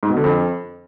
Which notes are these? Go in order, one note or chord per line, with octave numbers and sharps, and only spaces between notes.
G#2
B2
D3
F2